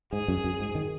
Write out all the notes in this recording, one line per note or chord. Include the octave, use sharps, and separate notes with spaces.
G#2 G#4
F#2
F#2
G#2
D#3